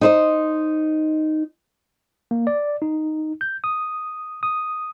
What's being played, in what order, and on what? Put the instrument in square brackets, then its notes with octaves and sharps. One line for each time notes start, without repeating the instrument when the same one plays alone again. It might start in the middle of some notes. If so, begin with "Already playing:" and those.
[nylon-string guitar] D#4 C5 D#5
[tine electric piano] A#3
D5
D#4
G6
D#6
D#6